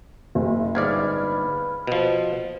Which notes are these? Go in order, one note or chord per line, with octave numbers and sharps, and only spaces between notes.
F#1
G1 G#2 B4 D5 F6 G#6
B2 F3